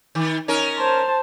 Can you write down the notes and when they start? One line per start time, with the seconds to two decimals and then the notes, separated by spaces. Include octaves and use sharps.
0.15 D#3
0.48 C#4 D#4 A#4
0.78 C5 A5